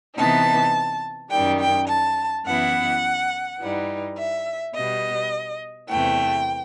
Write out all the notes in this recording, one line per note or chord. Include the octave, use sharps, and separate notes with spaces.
C3 E3 B3 D#4 A5
F#2 D#3 G3 G5
G5
A5
F#2 E3 B3 E4 F#5
G2 E3 G3 D#4
E5
B2 G3 B3 D#5
E2 C3 E3 A3 G5